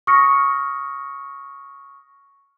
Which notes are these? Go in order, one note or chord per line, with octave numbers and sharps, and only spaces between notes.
C#6 D#6 F6 A#6 C#7